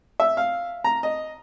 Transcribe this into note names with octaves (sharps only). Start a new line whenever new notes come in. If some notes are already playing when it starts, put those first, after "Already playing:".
E5
F5
A#5
D#5